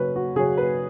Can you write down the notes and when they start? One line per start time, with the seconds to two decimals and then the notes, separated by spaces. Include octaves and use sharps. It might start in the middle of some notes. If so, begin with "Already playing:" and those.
Already playing: C#3 F#3 C#4 B4
0.16 F#4
0.36 C#3 F#3 C#4 G#4
0.58 B4